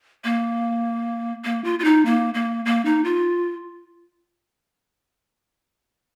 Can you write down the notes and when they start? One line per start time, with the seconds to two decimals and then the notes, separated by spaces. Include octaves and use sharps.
0.24 A#3
1.45 A#3
1.64 F4
1.79 F4
1.84 D#4
2.05 A#3
2.34 A#3
2.65 A#3
2.85 D#4
3.04 F4